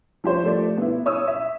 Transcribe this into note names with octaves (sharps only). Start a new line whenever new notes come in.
F3 G4 C5 C#5
F3 A3 D5
B3 E4
C#5 D#6 E6
E5